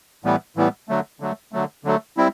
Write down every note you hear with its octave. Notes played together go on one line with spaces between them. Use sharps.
A2 E3 G3 B3
A2 E3 G3 B3
D3 F#3 A3
D3 F#3 A3
D3 F#3 A3
D3 F#3 A3
G3 C4 E4